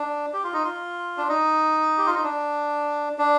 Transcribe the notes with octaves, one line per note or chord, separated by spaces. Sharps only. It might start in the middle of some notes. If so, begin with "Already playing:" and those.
Already playing: D4
G4
F4
D#4
F4
D4
D#4
G4
F4
D#4
D4
D4